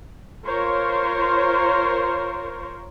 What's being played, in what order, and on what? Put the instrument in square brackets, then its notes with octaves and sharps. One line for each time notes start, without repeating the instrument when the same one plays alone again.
[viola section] F4 A#4 C5 C#5